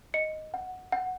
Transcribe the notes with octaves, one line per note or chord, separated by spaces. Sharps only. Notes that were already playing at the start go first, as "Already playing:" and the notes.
D#5 C#7
F#5
F#5